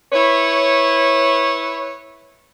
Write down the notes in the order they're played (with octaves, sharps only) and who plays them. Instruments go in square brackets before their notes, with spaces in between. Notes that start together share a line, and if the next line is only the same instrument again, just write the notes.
[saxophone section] E4 B4 C#5